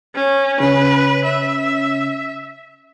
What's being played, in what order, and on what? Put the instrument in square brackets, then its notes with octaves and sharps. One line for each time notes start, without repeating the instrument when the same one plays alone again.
[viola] C#4
[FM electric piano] C#3 C#4 [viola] B4
[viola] E5